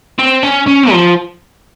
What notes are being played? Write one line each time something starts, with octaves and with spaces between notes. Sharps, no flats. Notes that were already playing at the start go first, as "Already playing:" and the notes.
C4
C#4
C#4
F3